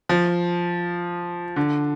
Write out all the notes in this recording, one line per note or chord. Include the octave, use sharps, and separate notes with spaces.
F3
D3